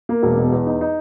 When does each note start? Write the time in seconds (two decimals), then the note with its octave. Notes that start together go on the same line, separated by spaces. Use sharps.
0.09 A#3
0.23 E1
0.37 B2
0.52 E2
0.66 D#4
0.81 D#4